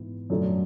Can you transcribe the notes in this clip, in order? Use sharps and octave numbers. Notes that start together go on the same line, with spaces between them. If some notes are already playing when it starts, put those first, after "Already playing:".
Already playing: G#2 E3 B3
F#2 D3 F#3 A3 D4